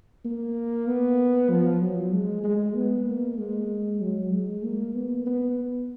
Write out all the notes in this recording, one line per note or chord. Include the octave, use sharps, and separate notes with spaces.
A#3
B3
F3
F#3
G#3
G#3
B3
A#3
G#3
F#3
G#3
A#3
B3
B3